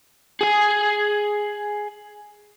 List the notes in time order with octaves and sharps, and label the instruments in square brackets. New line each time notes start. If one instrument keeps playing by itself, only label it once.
[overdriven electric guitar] G#4 G#5